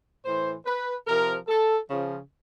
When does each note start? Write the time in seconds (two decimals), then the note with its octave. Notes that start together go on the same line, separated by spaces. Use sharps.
0.25 A2 E3 C5
0.66 B4
1.07 C3 F3 A#4
1.48 A4
1.89 C#3 F3